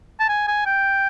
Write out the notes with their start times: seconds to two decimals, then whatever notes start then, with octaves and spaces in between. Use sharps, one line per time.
0.20 A5
0.29 G#5
0.47 G#5
0.66 G5